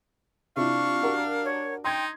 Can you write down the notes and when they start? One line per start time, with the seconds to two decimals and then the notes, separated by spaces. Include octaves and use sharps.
0.56 C3 D4 E4 F4 F5 C#6
1.02 F#4 G4 A#4
1.45 C#5
1.85 D#4 G5 C6 G#6